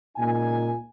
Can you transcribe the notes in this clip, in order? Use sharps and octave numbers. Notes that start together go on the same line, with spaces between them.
C#2 A#2 D#4 G#5